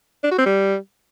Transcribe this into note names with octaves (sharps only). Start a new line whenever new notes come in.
D4
F#4
C4
G3